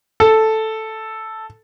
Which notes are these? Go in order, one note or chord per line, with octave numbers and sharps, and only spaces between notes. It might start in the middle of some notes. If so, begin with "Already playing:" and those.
A4